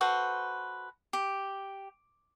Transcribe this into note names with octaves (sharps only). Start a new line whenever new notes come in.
F#4 A4 B4 C5
G4